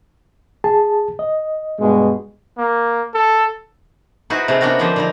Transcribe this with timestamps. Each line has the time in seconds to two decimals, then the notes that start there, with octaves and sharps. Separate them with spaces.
0.64 G#4 A5
1.19 D#5
1.79 G2 B2 G#3
2.58 A#3
3.14 A4
4.30 D#4 E4 F#4 G#4 B4 C5
4.48 C3 A3 G#4
4.61 B3 C#4 D4 F#4 A#4
4.79 D3 F3 A#3 G#4 C5
4.96 D3 G3 D#4